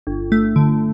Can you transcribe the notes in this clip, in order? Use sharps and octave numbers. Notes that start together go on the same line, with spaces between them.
G1
A3
D3